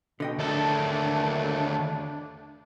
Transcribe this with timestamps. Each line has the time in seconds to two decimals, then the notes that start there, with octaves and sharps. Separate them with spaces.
0.20 B2 D3 D#5 G5
0.38 D#2 A3 D4 A4